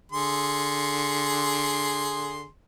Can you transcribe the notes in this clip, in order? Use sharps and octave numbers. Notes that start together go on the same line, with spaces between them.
D3 G#4 C6